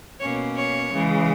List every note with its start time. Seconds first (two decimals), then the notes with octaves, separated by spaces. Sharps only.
0.19 B2 A#3 C#4 C#5
0.55 C#5
0.90 C#3 E3 G#3